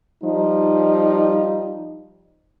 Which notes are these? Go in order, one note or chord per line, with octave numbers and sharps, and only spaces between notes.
F3 G3 D#4